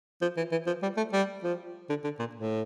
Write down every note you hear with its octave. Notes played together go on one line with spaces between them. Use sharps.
F3
E3
E3
F3
G3
A3
G3
F3
D3
D3
A#2
A2